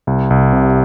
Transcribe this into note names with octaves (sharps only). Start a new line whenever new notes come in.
C2
C2
C3